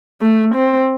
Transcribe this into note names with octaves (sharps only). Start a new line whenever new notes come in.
A3
C4